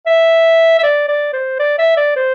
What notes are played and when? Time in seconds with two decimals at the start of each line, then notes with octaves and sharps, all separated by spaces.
0.06 E5
0.79 E5
0.83 D5
1.08 D5
1.33 C5
1.59 D5
1.78 E5
1.97 D5
2.16 C5